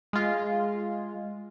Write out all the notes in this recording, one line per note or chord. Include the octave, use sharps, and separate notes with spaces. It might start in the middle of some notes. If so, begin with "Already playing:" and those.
G#3 F4